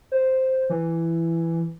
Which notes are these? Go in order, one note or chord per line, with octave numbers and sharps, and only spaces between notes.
C5
E3